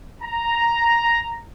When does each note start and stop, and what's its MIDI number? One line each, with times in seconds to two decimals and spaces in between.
0.22 1.40 82